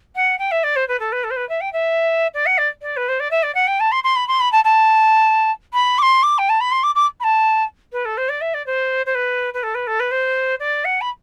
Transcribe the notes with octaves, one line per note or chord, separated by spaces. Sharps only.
F#5
G5
E5
D5
C5
B4
A4
B4
A4
C5
B4
E5
G5
E5
D5
F#5
D5
D5
B4
C5
D5
E5
D5
F#5
G5
A5
C6
C6
B5
C6
B5
A5
A5
B5
D6
C6
D6
G5
A5
B5
C6
D6
D6
B5
A5
B4
A4
C5
D5
E5
D5
C5
C5
B4
B4
A4
B4
A4
B4
C5
D5
F#5
B5